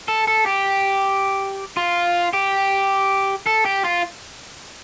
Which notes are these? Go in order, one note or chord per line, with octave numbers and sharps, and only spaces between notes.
A4
A4
G4
F4
G4
A4
G4
F4